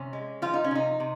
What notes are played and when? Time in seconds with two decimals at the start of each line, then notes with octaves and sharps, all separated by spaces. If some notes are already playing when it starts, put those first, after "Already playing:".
Already playing: C3 C#4
0.13 G#3
0.42 F3 F4
0.54 D#4
0.64 C#4
0.71 C3 D#4
1.00 C3